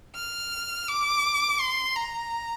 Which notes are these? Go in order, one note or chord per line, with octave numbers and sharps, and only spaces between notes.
F6
D6
C6
A#5